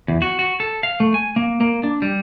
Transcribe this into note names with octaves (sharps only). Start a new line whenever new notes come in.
E2
F#4
F#4
A4
F5
A3
G#5
A#3
A#3
D4
G3